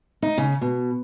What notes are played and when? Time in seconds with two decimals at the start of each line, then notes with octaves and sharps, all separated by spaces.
0.22 D#4
0.38 C#3
0.61 B2